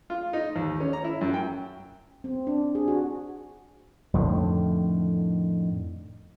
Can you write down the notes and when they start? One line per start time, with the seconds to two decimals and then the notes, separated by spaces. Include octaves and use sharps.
0.10 F4
0.33 D#4
0.56 D#2
0.80 C#4
0.93 A#5
1.04 E4
1.21 F#2
1.34 G5
2.24 C4
2.47 D4
2.75 G#4
2.88 F#4
4.14 F2 A2 D3 D#3